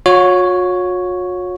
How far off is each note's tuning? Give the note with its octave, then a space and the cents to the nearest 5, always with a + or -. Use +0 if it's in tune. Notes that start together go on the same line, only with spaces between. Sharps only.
F#4 -45 C#5 +0